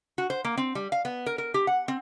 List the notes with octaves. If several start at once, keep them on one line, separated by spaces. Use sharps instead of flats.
F#4
C5
A#3
C4
G3
F5
B3
A#4
A#4
G4
F#5
C4